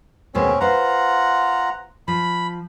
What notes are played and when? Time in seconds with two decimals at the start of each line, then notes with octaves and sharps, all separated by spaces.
0.35 D#2 B2 G#3 C4 C#4
0.60 F4 B4 C5 F#5 A#5
2.08 F3 B5